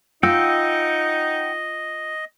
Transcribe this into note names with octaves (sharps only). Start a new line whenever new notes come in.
D#4 F4 D#5 F#5 G5 E6